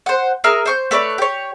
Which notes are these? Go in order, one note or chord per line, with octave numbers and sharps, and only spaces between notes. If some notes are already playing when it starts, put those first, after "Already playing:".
C5 F#5
G#4 A#4 E5 F6
C5 C#6 G6
A3 B4 C#5 D5
G4 C#5